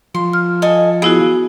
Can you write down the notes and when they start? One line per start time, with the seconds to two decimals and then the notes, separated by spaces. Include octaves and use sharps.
0.15 F3 C6
0.33 F6
0.62 A4 D#5 G#5
1.02 B3 E4 F#4 G#4